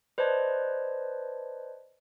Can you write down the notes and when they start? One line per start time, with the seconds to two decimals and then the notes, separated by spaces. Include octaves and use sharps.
0.18 B4 C5 D5 D#5 A5 G#6